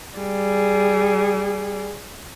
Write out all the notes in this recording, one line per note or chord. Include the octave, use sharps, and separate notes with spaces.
G3 G#4